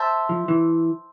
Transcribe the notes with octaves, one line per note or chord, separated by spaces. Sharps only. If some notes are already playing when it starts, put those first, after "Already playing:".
Already playing: C5 E5 A5
F3
E3